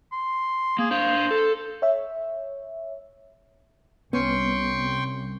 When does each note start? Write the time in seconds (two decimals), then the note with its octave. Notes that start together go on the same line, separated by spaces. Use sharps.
0.12 C6
0.79 A#3 G#4
0.91 D4 C5 F5
1.31 A4
1.82 C#5 E5
4.13 C2 B3 C#4 G5 C6 C#6